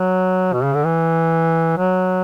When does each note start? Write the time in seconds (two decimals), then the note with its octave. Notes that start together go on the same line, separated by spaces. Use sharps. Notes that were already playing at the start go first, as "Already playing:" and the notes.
Already playing: F#3
0.53 B2
0.64 C#3
0.74 D3
0.85 E3
1.77 F#3